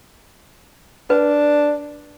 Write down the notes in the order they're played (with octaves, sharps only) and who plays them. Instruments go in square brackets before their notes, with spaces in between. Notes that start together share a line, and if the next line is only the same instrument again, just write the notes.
[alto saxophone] D4 [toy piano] B4